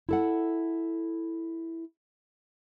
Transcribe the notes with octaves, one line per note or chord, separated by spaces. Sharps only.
E4 A4 F#5